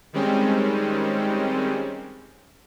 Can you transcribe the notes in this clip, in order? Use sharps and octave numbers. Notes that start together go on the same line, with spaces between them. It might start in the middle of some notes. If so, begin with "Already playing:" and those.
D#3 G3 G#3 C4 C#4